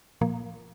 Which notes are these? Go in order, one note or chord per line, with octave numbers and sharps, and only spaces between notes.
A#2 F3 A#3